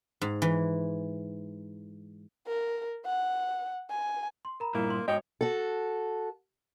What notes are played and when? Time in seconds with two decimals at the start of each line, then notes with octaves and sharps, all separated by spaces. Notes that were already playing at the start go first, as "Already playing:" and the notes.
0.21 G#2
0.42 E3
2.47 A#4
3.06 F#5
3.90 G#5
4.45 C6
4.60 A#4 A#5 B5
4.75 G2 A#2 A#3 E4
4.90 C6
5.08 G#2 F#4 C#5 D#5 G5
5.41 F#4 A4